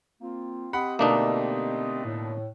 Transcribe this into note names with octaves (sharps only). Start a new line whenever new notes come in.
A#3 C4 F4
C4 G4 D#5 F#5 B5
B2 D3 A3 A#3 D4 D#4
A2